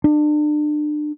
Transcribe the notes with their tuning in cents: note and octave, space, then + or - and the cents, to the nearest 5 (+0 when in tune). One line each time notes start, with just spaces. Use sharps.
D4 +35